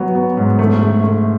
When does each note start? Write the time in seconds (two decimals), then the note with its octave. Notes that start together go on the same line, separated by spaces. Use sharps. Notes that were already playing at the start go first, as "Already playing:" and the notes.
Already playing: F#3 B3
0.15 B3
0.37 G#2
0.59 A3
0.81 A3
1.04 A3